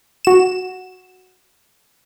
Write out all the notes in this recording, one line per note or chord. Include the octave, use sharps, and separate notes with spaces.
F#4 E7